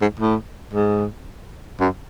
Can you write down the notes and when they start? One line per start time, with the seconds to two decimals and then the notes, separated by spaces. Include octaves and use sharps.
0.01 G#2
0.19 A2
0.73 G#2
1.80 F#2